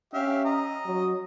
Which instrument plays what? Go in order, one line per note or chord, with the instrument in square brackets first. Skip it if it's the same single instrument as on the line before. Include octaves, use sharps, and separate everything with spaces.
[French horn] C#4 [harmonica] G4 E5 F5
[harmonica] D#5 A#5
[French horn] F#3